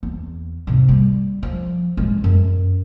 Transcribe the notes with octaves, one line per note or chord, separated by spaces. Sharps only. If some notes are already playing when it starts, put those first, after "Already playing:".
E2
G#2 C3
G3
F3
A2 G#3
F#2